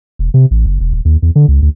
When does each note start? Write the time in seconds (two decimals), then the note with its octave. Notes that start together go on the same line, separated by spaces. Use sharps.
0.19 E1
0.34 C3
0.51 A1
0.66 F#1
0.81 E1
0.93 D#1
1.05 D#2
1.22 E2
1.36 D3
1.48 C#2
1.62 D2